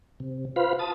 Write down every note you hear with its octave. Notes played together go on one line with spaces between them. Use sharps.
C3
F4 B4 C5 F5 B5
A5 D#6